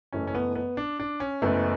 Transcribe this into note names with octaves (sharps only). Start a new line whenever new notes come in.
F#1 F#2 E3 A3 C#4
C#4
B3
B3
D4
D4
C#4
F#1 F#2 E3 A3 B3